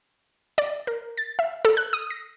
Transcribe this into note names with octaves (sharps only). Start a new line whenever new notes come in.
D5
A#4
A6
E5
A4
F#6
D#6
A#6